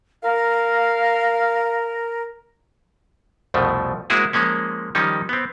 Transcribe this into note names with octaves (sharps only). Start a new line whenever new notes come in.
A#4 F5
C2 F2 B2 F3 A3
G#3 A#3 C4 E4 F#4 G#4
F3 G#3 A#3 C#4
D#3 F3 G3 C#4 D#4
B3 C4